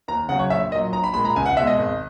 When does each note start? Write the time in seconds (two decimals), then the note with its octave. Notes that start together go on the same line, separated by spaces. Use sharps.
0.08 D#2 A#5
0.29 C#3 F#3 F#5
0.39 C#5
0.50 A#1 E5
0.71 A#2 D#5
0.76 F#3
0.92 A#1 A#5
1.04 B5
1.14 A#2 G#3 B5
1.25 A#5
1.36 C#2 G#5
1.46 F#5
1.56 B2 E5
1.61 G#3
1.67 D#5
1.78 G#1